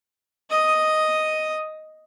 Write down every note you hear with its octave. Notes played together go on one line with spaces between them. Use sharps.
D#5 D#6